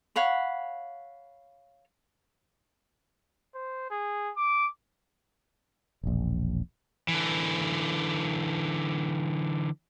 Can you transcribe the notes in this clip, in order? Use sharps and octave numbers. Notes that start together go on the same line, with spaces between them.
C#5 F5 F#5 B5
C5
G#4
D6
E1 A#1
D3 E3